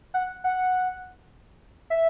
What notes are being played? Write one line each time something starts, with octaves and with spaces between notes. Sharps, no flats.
F#5
F#5
E5